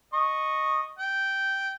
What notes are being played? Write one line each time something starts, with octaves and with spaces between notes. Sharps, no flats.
D#5 C#6
G5